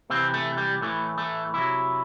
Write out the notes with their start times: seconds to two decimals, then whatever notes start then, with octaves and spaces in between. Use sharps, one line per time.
0.10 C3 E3 C4
0.34 A3
0.57 G3
0.81 A2 E3 A3
1.18 A3
1.54 C3 F#3 E4